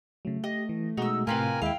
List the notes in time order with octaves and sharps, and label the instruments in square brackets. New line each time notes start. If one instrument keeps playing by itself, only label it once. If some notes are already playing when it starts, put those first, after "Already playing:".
[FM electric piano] C#3 F#3 [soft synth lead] A3
[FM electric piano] G4 [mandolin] D#5
[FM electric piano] E3
[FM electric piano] B2 G#3 F#4 [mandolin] D#4 E6
[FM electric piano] A2 C3 [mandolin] F4 G4 B4 [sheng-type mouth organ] A#4 G#5
[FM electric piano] D#2 G#3 [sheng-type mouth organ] E4 [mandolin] F5 G5